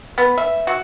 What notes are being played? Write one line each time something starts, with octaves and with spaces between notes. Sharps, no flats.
B3
E5
F#4